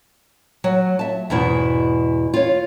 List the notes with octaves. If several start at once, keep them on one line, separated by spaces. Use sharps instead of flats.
F#3
E5 A5
E2 G#2 B2 E4
F4 C#5